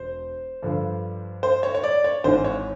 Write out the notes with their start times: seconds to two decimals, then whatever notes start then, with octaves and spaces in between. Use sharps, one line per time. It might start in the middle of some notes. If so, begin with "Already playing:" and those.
Already playing: E1 C5
0.63 G2 D3 F3
1.43 C5
1.63 C#5
1.75 C#5
1.84 D5
2.04 C#5
2.24 G#1 G#2 E3 C5
2.44 C#5